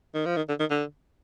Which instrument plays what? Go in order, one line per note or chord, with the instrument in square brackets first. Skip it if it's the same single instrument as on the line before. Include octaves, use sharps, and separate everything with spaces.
[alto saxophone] D#3
F3
D#3
D3
D#3
D3